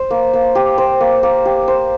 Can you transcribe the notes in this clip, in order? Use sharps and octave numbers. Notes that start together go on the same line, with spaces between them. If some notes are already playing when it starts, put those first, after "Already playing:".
Already playing: C5
A#3
A#3
G4
C5
A#3
A#3
G4
C5